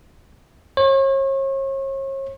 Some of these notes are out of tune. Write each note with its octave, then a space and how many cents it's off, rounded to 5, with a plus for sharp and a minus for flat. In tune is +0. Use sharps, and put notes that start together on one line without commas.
C#5 -40